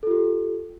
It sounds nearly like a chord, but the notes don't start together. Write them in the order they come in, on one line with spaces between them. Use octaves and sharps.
A4 F4 G4